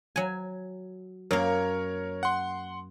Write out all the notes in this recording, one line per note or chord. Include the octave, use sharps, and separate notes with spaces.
F#3 G#5
F#2 A#3 A#4 C#5
F#5 C6